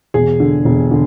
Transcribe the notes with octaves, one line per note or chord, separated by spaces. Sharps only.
E1 G#4
D3
E1
D3